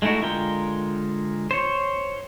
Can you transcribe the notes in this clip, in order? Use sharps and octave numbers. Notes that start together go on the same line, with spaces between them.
G#3 A3 D#4 E4 F#4
D3 G#3 F4 A#4 G5
C5 C#5